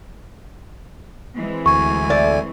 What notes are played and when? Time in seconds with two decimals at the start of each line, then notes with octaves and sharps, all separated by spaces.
1.37 E3 G#3 C4
1.66 D2 G#5 C#6
2.10 A3 D5